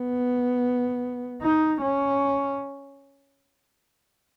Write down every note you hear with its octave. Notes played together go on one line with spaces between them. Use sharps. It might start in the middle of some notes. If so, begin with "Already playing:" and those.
Already playing: B3
D#4
C#4